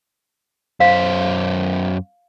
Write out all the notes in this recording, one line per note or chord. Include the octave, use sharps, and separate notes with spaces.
F#2 C5 F5